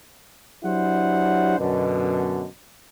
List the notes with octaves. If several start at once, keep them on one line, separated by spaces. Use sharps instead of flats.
F#3 D4 E4 G4 C5 F#5
F#2 B2 D3